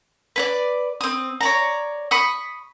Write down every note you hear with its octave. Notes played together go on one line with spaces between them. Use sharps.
B4 C#5 D5
C4 D#6
C#5 D5 A#5
B5 C#6 D#6